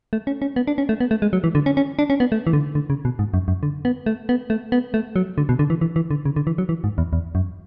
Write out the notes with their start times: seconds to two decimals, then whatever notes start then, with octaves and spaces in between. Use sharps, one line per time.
0.13 A3
0.27 C#4
0.42 C#4
0.56 B3
0.67 D4
0.78 C#4
0.89 A3
1.00 B3
1.11 A3
1.22 G#3
1.33 F#3
1.44 E3
1.55 D3
1.66 C#4
1.77 C#4
1.99 D4
2.10 C#4
2.20 B3
2.32 A3
2.47 E3
2.53 D3
2.75 D3
2.90 C#3
3.05 B2
3.19 G#2
3.34 F#2
3.48 F#2
3.63 D3
3.85 B3
4.06 A3
4.29 B3
4.50 A3
4.72 B3
4.94 A3
5.16 F#3
5.38 D3
5.49 B2
5.59 D3
5.70 E3
5.81 E3
5.96 E3
6.11 D3
6.25 C#3
6.36 D3
6.47 E3
6.58 F#3
6.69 E3
6.84 G#2
6.98 E2
7.13 E2
7.35 F#2